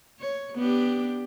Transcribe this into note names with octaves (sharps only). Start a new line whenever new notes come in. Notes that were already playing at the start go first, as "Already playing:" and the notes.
C#5
B3 D4 G4